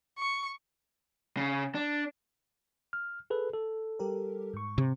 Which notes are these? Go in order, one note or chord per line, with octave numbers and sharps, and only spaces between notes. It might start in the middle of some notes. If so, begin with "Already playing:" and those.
C#6
C#3
D4
F6
G#4 A4 B4
A4
G3 G4 A#4
G#2 C#6
C3